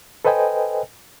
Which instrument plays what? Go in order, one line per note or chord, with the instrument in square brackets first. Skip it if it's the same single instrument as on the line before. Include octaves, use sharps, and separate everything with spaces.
[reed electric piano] A4 B4 C5 D#5 G5 G#5